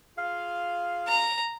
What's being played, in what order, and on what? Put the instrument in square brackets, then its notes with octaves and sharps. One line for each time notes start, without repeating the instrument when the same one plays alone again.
[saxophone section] F4 G#4 F5
[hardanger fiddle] A#5